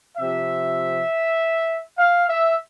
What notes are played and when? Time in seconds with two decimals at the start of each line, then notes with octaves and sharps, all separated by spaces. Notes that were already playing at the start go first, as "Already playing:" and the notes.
0.17 C3 F3 C4 E5
1.98 F5
2.28 E5